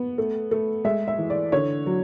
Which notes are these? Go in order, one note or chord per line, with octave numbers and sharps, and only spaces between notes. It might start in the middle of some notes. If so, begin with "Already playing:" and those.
Already playing: B3
A3
A3
G#3 E5
E5
E3
D5
D3 C#5
F#3